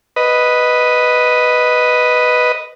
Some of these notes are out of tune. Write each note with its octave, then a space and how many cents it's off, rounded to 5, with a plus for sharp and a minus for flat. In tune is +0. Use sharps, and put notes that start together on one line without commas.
B4 +0 D#5 +0